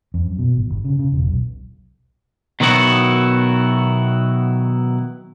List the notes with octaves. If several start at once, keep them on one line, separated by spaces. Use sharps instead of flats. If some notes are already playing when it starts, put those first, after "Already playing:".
F2
F#2
B2
G#1
G1
C#3
C#3
E1
B1
B2 D#3 F#3 B3 E4 F#4